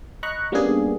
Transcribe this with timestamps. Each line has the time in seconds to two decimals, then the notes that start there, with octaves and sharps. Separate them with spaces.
0.23 D#5 A#5 B5 C#6 F#6
0.52 G3 A#3 B3 C#4 D4 G#4